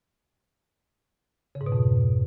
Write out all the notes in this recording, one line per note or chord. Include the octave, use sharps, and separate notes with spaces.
C#3
G#2
B2
F2